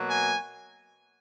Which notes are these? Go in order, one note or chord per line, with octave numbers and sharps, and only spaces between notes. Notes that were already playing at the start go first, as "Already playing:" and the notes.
Already playing: B2 F#3 A#3
G#5